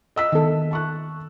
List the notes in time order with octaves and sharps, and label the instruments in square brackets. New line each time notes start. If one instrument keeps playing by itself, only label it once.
[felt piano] D#5 E6 B6
[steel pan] D#3 B3 A4
[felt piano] A5 C#6 F#6